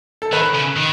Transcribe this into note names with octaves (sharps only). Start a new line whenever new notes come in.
A4
D#3 B4
C#3
D#3